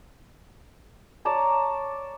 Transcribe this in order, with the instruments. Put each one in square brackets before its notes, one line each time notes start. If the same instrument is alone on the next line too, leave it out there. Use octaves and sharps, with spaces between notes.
[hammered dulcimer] C#5 D5 A5 A#5